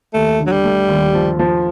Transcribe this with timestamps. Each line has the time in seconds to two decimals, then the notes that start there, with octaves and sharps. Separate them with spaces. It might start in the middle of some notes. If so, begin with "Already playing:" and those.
0.14 D#2 A3
0.40 D3
0.47 F#3
0.52 G3
0.65 A3
0.89 D#2
1.14 F3
1.39 F3